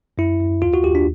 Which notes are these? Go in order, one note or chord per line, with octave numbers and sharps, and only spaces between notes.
F#2 E4
F#2
D#2 F4
F#4
D#2 G4
D4